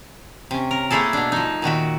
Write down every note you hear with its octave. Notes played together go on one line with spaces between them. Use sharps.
C3 C#4
A#4
A3 A#3 E4 G#4 A4
B2 D4
F3 D#4
A#2 D#3 F#4 E5